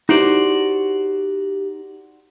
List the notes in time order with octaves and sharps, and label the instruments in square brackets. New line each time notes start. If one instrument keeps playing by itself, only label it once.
[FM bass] D#4 [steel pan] E4 [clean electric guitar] F#4 C5 D5 [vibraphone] G4